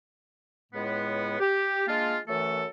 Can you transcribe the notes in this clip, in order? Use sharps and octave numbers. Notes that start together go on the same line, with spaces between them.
C#2 A2 G#3 B3
G4
G#3 A#3 D4 F4
F#2 E3 A3 A4